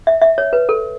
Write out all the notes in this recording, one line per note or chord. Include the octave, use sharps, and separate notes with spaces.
E5
E5
C#5
B4
A4